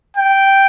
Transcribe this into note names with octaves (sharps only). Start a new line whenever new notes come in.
G5